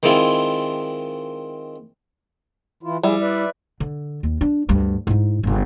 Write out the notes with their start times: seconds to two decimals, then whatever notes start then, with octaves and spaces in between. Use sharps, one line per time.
0.03 D#3 G#3 C4 E4 F4
2.83 E3 E4 F4
3.03 F3 G3 E4 G#4
3.21 B4 D5 E5
3.80 D3
4.23 D#2
4.41 D4
4.69 D2 G2
5.07 G#2 E4
5.43 G1 C#3